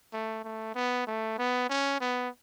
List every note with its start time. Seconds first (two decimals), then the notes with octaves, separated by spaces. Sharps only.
0.13 A3
0.45 A3
0.75 B3
1.07 A3
1.38 B3
1.69 C#4
2.01 B3